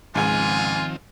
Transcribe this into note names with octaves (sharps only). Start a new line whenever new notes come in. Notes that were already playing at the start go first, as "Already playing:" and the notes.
C#2 G#2 D#3 F3 C4 F4 G#5